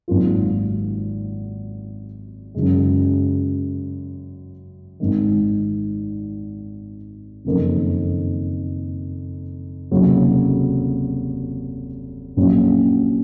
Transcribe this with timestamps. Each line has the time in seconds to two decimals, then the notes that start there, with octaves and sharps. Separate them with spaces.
0.08 G#1 G#2 F#3 A#3 F4
2.54 F#2 C#3 G#3
5.00 G#1 G#2 D#3
7.45 F#1 F2 D#3 A#3
9.91 F1 D#2 C#3 F#3
12.37 A#1 A#2 F#3 C#4